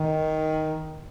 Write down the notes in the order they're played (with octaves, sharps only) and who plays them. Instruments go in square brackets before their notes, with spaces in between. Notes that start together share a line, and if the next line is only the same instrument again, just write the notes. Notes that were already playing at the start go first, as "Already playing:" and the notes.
Already playing: [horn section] D#3